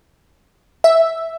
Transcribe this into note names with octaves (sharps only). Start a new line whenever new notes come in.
E5